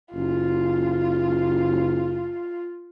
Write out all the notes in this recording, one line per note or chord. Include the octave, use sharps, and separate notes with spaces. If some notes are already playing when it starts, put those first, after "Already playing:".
F#1 F4